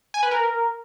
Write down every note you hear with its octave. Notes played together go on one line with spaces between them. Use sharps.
G#5
B4
A#4